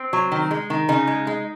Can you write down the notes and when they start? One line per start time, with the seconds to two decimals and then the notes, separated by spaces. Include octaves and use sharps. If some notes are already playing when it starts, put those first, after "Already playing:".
Already playing: C4
0.13 F#3
0.32 D#3
0.51 G#3
0.70 D#3
0.88 C#3 D#4
1.07 G#3
1.27 G#3